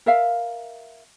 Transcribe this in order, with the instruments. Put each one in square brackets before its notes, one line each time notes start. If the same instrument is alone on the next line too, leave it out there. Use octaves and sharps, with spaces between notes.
[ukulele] A#4 E5 F5